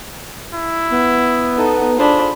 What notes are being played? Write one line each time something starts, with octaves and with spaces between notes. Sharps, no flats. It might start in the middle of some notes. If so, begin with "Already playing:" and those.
E4
B3
D#4 A4
D4 F4 G#4 C5 B5